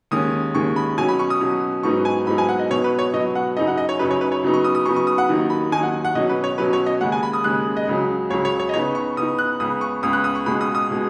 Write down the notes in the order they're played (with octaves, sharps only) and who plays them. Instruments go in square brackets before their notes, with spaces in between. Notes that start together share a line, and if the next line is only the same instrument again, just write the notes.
[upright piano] D#2 D#3 G#3 C#4 [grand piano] D#6
[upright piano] D#2 D#3 G#3 C#4 [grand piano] C#6
[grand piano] B5
[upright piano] B2 F#3 C#4 [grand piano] G#5
[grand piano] B5
C#6
D#6
[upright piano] B2 F#3 C#4
[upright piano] G#2 F#3 B3 D#4 [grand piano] C#6
[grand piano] G#5
[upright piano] G#2 F#3 B3 D#4 [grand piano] B5
[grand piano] G#5
F#5
D#5
[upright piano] B2 F#3 B3 [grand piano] C#5
[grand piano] B4
C#5
[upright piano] B2 F#3 B3 [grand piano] D#5
[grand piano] F#5
[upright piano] F#2 C#3 F#3 D#4 [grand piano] D#5
[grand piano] F#5
D#5
C#5
[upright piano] F#2 C#3 F#3 D#4 [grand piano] B4
[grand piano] C#5
B4
C#5
[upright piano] C#3 F#3 B3 D#4
[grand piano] C#6
D#6
D#6
[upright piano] C#3 F#3 B3 D#4 [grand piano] C#6
[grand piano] C#6
D#6
F#5
[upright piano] D#2 D#3 F#3 D#4
[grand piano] B5
[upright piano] D#2 D#3 F#3 D#4 [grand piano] G#5
[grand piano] F#5
F#5
[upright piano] B2 F#3 C#4 [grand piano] D#5
[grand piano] B4
C#5
[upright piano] B2 F#3 C#4 [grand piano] B4
[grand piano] C#5
D#5
[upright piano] D#2 C#3 G#3 [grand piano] F#5
[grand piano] G#5
B5
D#6
[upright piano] D#2 C#3 G#3 [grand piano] F#6
[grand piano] D#5
[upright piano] C#2 C#3 F#3
[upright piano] C#2 C#3 F#3 [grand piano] C#5
[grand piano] C#5
C#5
D#5
[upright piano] C#3 B3 D#4 [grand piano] C#5
[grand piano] C#6
[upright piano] C#3 B3 D#4 [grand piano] D#6
[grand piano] F#6
[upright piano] C#2 C#3 B3 [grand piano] D#6
[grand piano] C#6
[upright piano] C#2 C#3 B3 [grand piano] D#6
[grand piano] F#6
D#6
C#6
[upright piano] C#2 B2 G#3 [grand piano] B5
[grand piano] D#6
D#6
[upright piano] B2 G#3